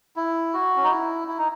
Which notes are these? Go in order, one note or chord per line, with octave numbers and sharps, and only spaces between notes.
E4
F#4
C#4
D#4
E4
E4
D#4